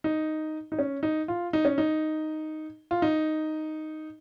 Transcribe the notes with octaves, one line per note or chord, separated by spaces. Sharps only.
D#4
D#4
C#4
D#4
F4
D#4
C#4
D#4
F4
D#4